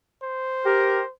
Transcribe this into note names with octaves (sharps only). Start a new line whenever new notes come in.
C5
G4 A#4